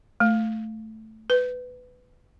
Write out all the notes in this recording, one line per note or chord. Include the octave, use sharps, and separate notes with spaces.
A3
B4